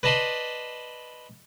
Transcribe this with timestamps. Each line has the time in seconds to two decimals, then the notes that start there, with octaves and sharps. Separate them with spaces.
0.03 B4 D5 D#5 A5 B5 C6